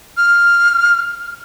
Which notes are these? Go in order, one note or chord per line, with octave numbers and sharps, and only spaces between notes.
F6